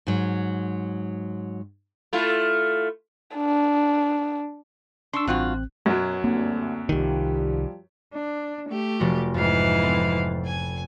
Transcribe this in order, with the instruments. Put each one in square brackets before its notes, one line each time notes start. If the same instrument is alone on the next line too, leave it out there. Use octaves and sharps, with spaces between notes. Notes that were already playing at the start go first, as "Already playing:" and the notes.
[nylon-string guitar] G#2 F#3
[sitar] A3 E4 F4
[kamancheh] D4
[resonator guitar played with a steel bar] D4 [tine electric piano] C6 C#6 E6
[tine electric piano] A1 C4 F#6 [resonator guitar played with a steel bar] G2 F4 F#4
[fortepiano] F#2 F#3 [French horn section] B2
[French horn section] D2 G2 D3 [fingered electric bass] A#3 C4
[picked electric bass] C2 D#3 [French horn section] F3 G3 G4
[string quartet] D4
A3 G4
[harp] F1 F3 F#4
[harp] F2 [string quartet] G#2 E3 F5
[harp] B3 C4 A4
[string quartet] G#5